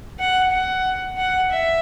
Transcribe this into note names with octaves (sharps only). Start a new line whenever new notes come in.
F#5
F#5
F#5
E5